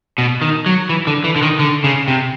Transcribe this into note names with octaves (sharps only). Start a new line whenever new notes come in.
B2
D#3
F#3
E3
D3
E3
D3
D#3
D3
C#3
C3